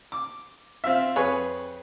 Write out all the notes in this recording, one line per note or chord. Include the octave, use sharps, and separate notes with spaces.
D6
C4 F4 E5
F2 G#4 B4 C#5 C#6